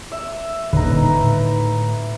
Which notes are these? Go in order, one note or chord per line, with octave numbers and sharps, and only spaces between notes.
E5
D#1 D3 D#4 B4 A#5
A2